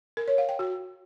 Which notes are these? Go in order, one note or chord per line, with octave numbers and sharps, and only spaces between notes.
A#4
C#5
F5
G5
F#4